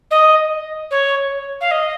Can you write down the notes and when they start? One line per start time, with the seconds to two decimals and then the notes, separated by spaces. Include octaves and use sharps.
0.11 D#5
0.91 C#5
1.61 F5
1.71 D#5